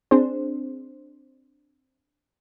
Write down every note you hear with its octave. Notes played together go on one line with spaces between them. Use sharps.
C4 D4 G#4 C5